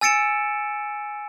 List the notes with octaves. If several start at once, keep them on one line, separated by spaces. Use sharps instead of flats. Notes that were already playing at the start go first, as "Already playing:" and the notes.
G#5 E6 A6 C#7 D7 E7